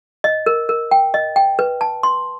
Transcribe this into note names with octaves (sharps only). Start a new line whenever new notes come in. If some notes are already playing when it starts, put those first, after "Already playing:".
D#5
A#4
A#4
G5
D#5
G5
B4
A5
C6